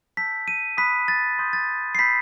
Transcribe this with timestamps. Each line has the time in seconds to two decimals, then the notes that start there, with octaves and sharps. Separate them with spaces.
0.17 A5 E6 G6 B6
0.48 D#7
0.77 B5 D#6 F#6 B6
1.08 A6
1.39 C6 D#6 G6
1.53 A6
1.95 C7
1.99 B5 E6 G6 B6